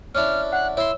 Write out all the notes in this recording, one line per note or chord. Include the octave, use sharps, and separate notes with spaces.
C#4 D4 E4 F6
F#5 F#6
E4 C#5 C6 E6